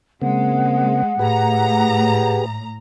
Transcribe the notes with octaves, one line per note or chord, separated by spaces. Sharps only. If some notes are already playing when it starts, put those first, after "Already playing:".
C#3 G#3 A#3 C4 F#5
A2 G4 G#4 B4 A#5